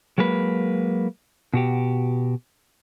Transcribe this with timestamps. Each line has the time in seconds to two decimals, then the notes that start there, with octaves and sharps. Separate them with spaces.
0.18 F#3 G#3 A#3 B4
1.54 B2 F#4 G4